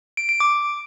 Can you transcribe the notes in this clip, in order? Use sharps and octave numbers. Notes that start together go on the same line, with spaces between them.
D7
D7
D6